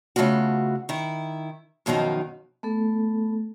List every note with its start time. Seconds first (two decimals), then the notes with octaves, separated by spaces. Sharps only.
0.16 C#3 A3 B3 F4 F#4
0.89 D#3 E4
1.86 F#2 B2 D#3 F3 D#4
2.63 A3 B3 A4